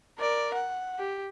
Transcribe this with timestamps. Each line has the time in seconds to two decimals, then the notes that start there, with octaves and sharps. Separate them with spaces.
0.19 A#4 D5
0.54 F#5
0.99 G4